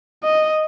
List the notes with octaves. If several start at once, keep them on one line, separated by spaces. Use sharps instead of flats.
D#5